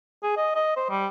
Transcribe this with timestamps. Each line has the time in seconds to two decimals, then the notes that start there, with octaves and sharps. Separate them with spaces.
0.23 G#4
0.37 D#5
0.55 D#5
0.77 C5
0.90 G3